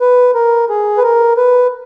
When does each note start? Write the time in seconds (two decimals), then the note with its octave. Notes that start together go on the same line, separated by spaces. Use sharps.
0.01 B4
0.34 A#4
0.69 G#4
0.98 B4
1.03 A#4
1.37 B4